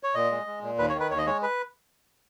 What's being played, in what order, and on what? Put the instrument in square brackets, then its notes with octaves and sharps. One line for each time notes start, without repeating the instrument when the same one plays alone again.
[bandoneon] C#5
A#2 D#5
G#3
G#3
A#2
D#2 B4
C#5
D#3
B4
D#2 C#5
D#5
G#3 C#5
B4